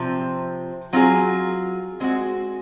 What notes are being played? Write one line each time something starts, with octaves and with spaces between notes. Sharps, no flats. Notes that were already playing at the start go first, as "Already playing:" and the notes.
Already playing: C3 F3 C4
F#3 C4 F4 G#4
G#3 C4 F#4